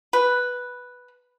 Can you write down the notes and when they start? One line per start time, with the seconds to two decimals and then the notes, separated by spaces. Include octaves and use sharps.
0.13 B4